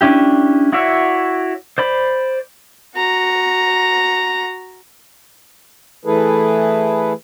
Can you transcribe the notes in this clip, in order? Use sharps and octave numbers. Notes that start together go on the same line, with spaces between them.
C#4 D4 E4 G4
E4 F#4 C#5 D5 E5
C5 D5 B5
F#4 A#5
E3 A3 E4 G#4 A4 B4